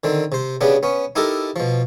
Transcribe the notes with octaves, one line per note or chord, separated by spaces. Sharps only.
D3 D#3 C4
C3 C5
C#3 B3 D4 G4
B3 C#4
D#4 E4 G4 A4 A#4
B2 F3